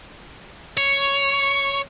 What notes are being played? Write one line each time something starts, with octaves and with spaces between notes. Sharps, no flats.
C#5